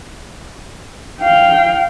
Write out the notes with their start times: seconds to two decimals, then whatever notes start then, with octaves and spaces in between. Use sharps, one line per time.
1.21 F5 G5